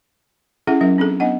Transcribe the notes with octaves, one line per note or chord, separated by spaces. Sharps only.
C#4 E4 G#4 A4 E5 F#5
F#3 C#4 A#4 E5
C4 D4 G#4 A4
B3 D4 D#5 F#5